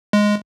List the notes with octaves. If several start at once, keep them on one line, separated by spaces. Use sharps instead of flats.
G#3